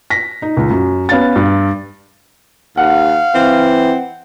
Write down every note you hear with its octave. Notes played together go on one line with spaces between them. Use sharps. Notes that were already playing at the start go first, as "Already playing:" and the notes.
A#6 B6
D#4
C#2
F#2
B3 C#4 F5 A6
G2
D#2 F5 F#5
E3 C4